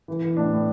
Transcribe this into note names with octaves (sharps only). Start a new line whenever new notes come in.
E3
E3
A2 D4
A2